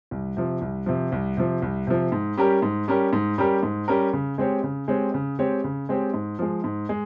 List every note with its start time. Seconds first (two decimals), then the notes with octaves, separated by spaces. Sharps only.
0.11 C2
0.37 C3 F3
0.61 C2
0.86 C3 F3
1.12 C2
1.37 C3 F3
1.62 C2
1.87 C3 F3
2.12 G#2
2.37 G3 C#4 G4 A#4
2.62 G#2
2.88 G3 C#4 G4 A#4
3.13 G#2
3.38 G3 C#4 G4 A#4
3.63 G#2
3.88 G3 C#4 G4 A#4
4.13 C#3
4.38 G#3 C4 G4 C#5
4.63 C#3
4.88 G#3 C4 G4 C#5
5.14 C#3
5.39 G#3 C4 G4 C#5
5.64 C#3
5.89 G#3 C4 G4 C#5
6.14 G#2
6.39 F3 G#3
6.64 G#2
6.89 G#3